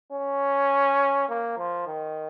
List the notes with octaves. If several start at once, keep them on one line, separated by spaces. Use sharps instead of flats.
C#4
A#3
F3
D#3